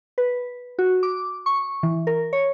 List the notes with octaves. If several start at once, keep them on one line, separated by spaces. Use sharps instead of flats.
B4
F#4
D6
C#6
E3
A#4
C#5